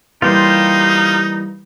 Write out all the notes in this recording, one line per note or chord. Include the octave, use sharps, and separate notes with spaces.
E3 G3 A#3 D#4 F4 G4 C5